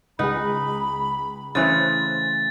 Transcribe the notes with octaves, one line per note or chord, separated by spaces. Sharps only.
C#2 D#4 G#4 B4 F#5 B5
C#3 E3 A3 C5 C6 F#6 A6